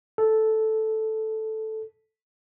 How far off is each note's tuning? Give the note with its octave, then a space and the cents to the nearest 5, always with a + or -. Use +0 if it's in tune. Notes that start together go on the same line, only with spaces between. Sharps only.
A4 -5